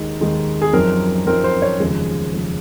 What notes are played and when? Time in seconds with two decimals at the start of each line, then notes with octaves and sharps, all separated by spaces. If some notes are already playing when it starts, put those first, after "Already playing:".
Already playing: D#2 D#3 G#3 D#4
0.21 D#2 D#3 G#3 D#4
0.62 G#4
0.73 F#2 F3 C4 D#4 A#4
1.27 F#2 F3 C4 D#4 A#4
1.44 C5
1.62 C#5
1.80 F1 D#2 C#3 F3 G#3
2.33 C#3 F3 G#3